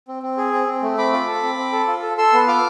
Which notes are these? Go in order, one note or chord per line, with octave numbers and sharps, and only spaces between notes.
C4
C4
G#4
C4
C4
A3
C4 B5 D6
F4
A4
C4
C4
A4
F4
A4
A4 C6 E6
B3
F4 D6 F6